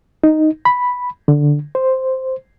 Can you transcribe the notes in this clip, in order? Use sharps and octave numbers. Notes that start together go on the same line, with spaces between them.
D#4
B5
D3
C5